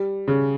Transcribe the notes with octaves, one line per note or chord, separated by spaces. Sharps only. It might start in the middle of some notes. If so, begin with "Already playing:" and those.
Already playing: G3
C#3